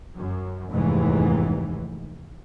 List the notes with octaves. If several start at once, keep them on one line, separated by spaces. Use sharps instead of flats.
F#2
F1 D#2 G#2 E3